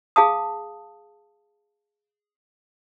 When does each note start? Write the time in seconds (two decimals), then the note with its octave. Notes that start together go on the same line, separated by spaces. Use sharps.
0.16 G#4 F5 A5 D#6